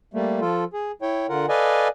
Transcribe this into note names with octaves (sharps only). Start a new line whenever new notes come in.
G3 A3 A#3
F3 F4 A4
G#4
E4 C#5 G5
D3 F4 A#4 F#5
A4 B4 D5 D#5 F5 G#5